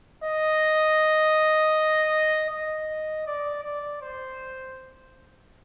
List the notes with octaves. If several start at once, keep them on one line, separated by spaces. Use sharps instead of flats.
D#5
D#5
D5
D5
C5